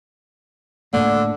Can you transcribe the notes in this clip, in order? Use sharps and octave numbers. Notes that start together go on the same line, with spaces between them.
A2 D3 A3 A#3